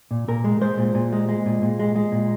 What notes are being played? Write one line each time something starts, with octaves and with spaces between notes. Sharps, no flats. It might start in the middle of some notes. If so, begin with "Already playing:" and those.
A#2
A#2 A#4
G#3
G#3 C5
A#2
A#2
G#3
G#3
A#2
A#2
G#3
G#3
A#2